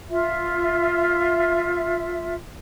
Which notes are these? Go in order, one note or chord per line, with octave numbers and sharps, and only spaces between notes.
F4 E5